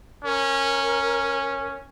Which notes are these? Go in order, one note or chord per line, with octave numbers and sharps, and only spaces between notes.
C#4 A#4